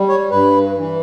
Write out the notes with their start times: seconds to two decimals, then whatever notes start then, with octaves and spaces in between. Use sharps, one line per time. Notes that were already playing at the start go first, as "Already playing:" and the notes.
Already playing: G3
0.09 C#5
0.31 G2 B4
0.76 E3